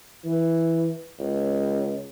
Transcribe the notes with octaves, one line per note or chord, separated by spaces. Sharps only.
E3
C#2